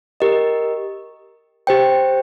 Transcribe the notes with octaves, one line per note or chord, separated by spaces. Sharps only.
G4 A#4 D#5
G4 C5 G5